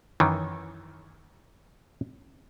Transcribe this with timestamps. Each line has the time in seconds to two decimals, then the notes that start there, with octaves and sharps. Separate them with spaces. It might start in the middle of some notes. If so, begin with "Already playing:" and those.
0.20 F#2 D#3 E3